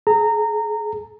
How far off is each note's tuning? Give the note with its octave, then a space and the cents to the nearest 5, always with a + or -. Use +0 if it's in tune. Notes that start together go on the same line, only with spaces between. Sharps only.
G#4 +40 A#5 -20